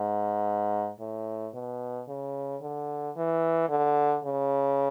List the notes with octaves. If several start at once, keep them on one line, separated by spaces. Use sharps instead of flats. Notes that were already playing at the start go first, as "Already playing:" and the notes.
Already playing: G#2
A2
B2
C#3
D3
E3
D3
C#3